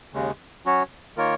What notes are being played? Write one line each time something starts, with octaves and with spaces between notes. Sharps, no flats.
D#2 C#3 G#3
F#3 C#4 F#4 C#5
D#3 A#3 F4 A#4 C#5